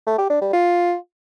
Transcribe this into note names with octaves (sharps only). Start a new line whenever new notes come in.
A3
G4
D4
G3
F4